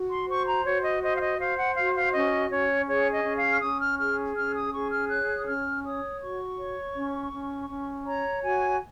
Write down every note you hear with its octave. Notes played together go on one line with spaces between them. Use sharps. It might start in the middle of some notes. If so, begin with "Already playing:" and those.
Already playing: F#4
C6
C5 C#6
A#5
F#4 C#5
D#5
C5 D#5
F5
D#5
C5 F5
F#5
F#4 F5
F5
C#4 D#5
C#4 C#5
G#4 C#5
D#5
C#4
F5
F6
C#4 D#6
F6
G#4 F6
C#4 F6
D#6
G#4 C#6
F6
C#5 F#6
D#6
C#4 F6
C#5 D#6
F#4 C#6
C#5
C#4
C#4
C#4
C#5 A#5
F#4 G#5